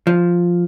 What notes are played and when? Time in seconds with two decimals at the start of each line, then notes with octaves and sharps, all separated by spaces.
0.07 F3